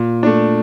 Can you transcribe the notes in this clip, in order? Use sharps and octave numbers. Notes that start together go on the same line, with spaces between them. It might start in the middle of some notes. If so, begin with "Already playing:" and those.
Already playing: A#2
A3 D4